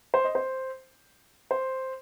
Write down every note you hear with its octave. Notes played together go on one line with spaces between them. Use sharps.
C5
D#5
C5
C5